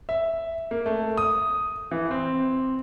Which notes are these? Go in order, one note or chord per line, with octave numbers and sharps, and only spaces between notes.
E5
A#3
A3
D#6
E3
C4